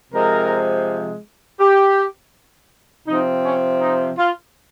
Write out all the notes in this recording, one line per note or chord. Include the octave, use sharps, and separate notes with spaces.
C3 F3 G#3 A#4
G4
C3 F3 C4 D#4
C#4
D#4
F4